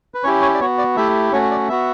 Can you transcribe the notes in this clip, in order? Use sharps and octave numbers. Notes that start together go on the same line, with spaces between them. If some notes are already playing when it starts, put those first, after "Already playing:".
B4
C#4 E4 G4 C#5
C#5
D5
B3 F#4 C#5
D5
A3 E4 G4 E5
A3 C#4 F#4 C#5
D5
B3 F#4 E5